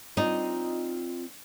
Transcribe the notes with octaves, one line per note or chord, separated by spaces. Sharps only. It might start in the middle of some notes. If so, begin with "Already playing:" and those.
C4 D#4 F4 D5 D#5